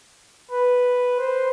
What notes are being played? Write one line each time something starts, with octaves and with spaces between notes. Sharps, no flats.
B4
C5